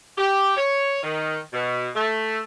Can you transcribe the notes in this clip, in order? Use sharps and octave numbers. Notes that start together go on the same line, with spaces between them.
G4
C#5
D#3
B2
A3